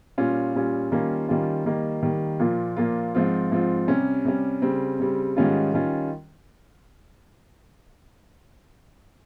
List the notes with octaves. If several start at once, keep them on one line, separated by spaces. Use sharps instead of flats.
A#2 G3 C#4 F4
A#2 G3 C#4 F4
D#3 G3 A#3 C#4 F4
D#3 G3 A#3 C#4 F4
D#3 G3 A#3
D#3 G3 A#3
A#2 F3 A#3 F4
A#2 F3 A#3 F4
G#2 F3 C4 F4
G#2 F3 C4 F4
C3 G3 C#4
C3 G3 C#4
C#3 G3 C4
C#3 G3 C4
G#2 D#3 G3 C#4 F4
D#3 G3 C#4 F4